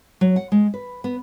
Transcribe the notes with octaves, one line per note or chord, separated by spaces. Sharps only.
F#3
F#5
G#3
B4
B3